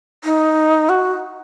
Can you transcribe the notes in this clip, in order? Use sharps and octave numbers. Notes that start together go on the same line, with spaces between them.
D#4
F#4